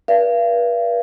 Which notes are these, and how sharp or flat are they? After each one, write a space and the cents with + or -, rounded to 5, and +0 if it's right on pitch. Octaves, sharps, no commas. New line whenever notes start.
B4 -45 D5 +0 F5 -40